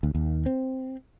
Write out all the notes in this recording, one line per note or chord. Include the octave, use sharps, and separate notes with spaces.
D2
D#2
C4